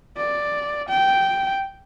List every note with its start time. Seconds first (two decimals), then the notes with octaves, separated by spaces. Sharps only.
0.17 D5
0.89 G5